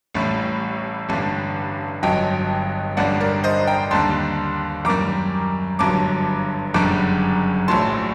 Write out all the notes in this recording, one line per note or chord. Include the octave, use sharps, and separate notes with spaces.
A1 A2 G3
A1 G2 D3 G3
G1 G2 F#3 D#5 G5
A1 G2 D3 G3 D5 F#5
A#4 D5
C5 D#5
G5 A#5
D#2 D3 G3 A5 C6
F#2 D#3 G3 A#5 D6
G1 G2 D3 F#3 A#5 D6
F#1 F#2 D3 G3 A#5 D6
A#1 A2 F#3 A5 C6